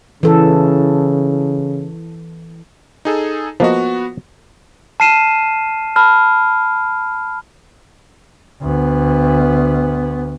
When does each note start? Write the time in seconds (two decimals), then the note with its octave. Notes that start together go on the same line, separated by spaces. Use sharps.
0.23 C#3 E3 A4
3.05 D#4 G#4 A4
3.60 F3 A#3 B3 F#4 D#5
5.00 A5 F6 C7 D#7 E7
5.96 A5 B5 F6
8.62 D2 B3